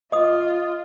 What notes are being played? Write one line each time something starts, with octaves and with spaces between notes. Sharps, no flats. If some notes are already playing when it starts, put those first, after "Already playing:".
F4 D#5 D#6